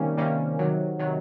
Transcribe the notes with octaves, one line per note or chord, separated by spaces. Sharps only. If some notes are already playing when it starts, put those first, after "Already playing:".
Already playing: C3 D#3 G3 A#3 C#4
C3 D#3 G3 A#3 C#4
C3 D#3 F#3
C3 D#3 F#3